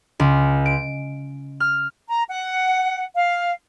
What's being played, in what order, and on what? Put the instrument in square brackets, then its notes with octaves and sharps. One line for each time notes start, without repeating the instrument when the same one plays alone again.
[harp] C#2
D7
F6
[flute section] A#5
F#5
F5